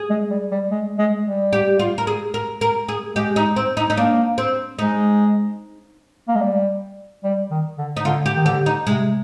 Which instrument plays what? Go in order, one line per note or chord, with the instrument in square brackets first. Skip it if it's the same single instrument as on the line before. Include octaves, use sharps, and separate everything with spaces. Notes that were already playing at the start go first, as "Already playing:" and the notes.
Already playing: [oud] G#4
[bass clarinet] G#3
G3
G3
G#3
G#3
G3
[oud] G4
F4
A#4
G#4
A#4
A#4
G#4
[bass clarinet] G#3 [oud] G4
[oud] D#4
C4
D#4
D#4
[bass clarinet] A#3 [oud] D4
[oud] C4
[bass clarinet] G#3 [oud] D#4
[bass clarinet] A#3
G#3
G3
G3
D#3
D3
[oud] D#4
[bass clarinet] D3 [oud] F4
[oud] G4
[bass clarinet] D#3
[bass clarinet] D3 [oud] G4
[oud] D#4
[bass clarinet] C3 [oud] G#3